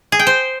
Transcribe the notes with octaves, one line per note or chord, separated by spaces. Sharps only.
G#4
G5
C5